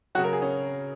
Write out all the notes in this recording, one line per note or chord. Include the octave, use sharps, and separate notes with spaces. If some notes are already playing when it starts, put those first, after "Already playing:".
C#3 F#3 F#4
A#4
G#4
C#4